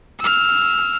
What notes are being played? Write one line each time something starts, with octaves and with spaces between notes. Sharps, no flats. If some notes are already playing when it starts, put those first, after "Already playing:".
E6 F6